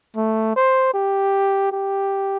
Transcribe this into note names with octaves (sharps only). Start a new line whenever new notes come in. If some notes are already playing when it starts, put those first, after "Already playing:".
A3
C5
G4
G4